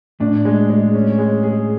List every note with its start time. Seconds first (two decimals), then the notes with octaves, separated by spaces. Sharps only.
0.20 A2 D4
0.45 G#3
0.70 G#3
0.94 C#4
1.18 G#3
1.43 G#4